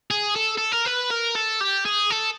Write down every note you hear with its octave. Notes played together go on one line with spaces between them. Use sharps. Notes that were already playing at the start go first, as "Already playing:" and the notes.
G#4
A4
A4
A#4
B4
A#4
A4
G4
G#4
A4